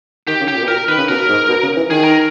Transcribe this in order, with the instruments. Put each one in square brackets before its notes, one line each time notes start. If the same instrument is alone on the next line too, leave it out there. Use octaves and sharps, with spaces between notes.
[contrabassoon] D#3 [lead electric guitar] G4
[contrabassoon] C#3
[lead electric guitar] G4
[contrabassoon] A#2
B2
[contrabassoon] A#2 [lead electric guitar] A#4
[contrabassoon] D#3 [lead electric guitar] B4
[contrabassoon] C#3
[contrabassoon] B2 [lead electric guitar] A#4
[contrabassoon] G#2
B2
C#3
E3
[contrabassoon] D#3 [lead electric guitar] G#4
[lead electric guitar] A#4